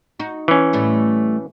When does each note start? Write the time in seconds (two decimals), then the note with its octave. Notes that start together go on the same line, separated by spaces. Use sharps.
0.19 D#4 F#4
0.48 E3 C#4
0.73 A2 G3 A3